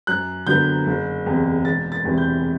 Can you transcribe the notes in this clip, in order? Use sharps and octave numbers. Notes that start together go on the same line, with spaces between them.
F#2 F#6
D3 F#3 B3 G6
F#1
E2 C3
E1 A6
A6
E2 C3 E3
G6